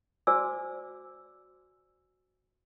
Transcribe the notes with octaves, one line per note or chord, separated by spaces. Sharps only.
F#4 C5 D5 G#5 D6 E6